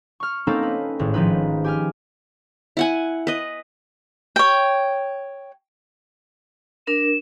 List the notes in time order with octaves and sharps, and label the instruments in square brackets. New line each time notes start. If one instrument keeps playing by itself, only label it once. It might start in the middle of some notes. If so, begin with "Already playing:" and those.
[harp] C#6 F6
A#3 C4 C#4 D#4 A4 A#4
B4
G#1 A2
D#3 F3 D#4 B4
G4 G#5 F6
[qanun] E4 F#5 G#5
B4 D#5
[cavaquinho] C#5 G5
[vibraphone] D4 A#4 [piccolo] E7